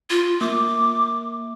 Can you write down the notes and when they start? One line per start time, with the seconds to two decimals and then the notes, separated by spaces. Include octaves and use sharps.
0.10 F4
0.41 A#3 D6